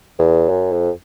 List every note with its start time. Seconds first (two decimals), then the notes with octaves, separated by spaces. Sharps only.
0.19 E2
0.49 F#2
0.72 F2